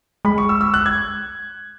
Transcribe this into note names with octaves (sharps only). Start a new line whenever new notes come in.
G#3 B5
C#6
E6
E6
F#6
G#6